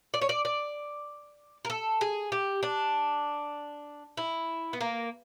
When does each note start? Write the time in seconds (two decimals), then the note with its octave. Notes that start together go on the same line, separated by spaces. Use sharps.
0.14 D5
0.22 C#5
0.29 D5
0.45 D5
1.65 A#4
1.70 A4
2.01 G#4
2.32 G4
2.63 D4
4.17 E4
4.73 B3
4.81 A#3